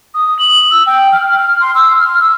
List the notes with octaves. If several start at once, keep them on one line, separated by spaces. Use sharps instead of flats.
D#6
F#7
E6
G5
F6
F6
C6
E6
F6
E6